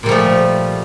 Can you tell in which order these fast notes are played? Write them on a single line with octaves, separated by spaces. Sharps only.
A#2 G3 F3 A3